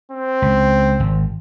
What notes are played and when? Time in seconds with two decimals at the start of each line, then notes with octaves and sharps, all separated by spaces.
0.11 C4
0.42 C#2
1.00 G#1